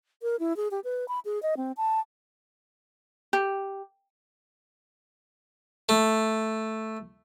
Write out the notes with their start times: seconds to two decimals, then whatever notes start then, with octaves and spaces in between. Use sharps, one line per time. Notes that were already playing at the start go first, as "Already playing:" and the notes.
0.22 A#4
0.40 E4
0.57 G#4
0.71 G4
0.84 B4
1.08 B5
1.25 G#4
1.43 D#5
1.57 C4
1.77 A5
3.33 G4
5.89 A3